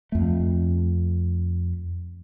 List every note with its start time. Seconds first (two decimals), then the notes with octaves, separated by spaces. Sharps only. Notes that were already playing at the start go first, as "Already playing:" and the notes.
0.12 F2 A3